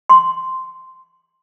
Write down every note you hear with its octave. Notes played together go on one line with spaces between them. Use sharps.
C6